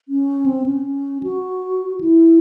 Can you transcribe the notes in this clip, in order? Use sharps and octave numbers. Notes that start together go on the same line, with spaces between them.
C#4
C4
C#4
F#4
E4